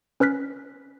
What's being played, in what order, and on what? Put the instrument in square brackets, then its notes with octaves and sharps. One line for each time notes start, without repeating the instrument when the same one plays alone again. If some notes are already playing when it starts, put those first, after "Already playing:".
[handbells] C#4 B4 F6 F#6 B6